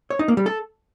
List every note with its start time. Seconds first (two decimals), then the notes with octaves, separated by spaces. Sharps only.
0.10 C#5
0.19 D#4
0.28 A#3
0.37 G3
0.46 A4